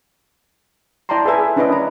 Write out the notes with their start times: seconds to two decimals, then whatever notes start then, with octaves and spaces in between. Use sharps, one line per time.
1.09 E4 D5 G5 A5 A#5 C6
1.25 G#4 A4 B4 E5 G#5 A5
1.56 C#4 D4 E4 B4 D5 D#5
1.69 A#4 A#5